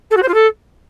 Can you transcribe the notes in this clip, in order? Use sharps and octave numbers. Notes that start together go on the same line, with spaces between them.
A4
F#4
C5
F4
A4